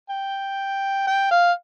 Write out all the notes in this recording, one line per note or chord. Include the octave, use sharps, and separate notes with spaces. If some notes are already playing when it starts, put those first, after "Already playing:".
G5
G5
F5